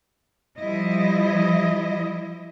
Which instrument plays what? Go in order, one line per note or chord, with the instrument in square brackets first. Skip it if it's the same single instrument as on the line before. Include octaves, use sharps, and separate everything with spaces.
[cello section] F3 G3 E4 D#5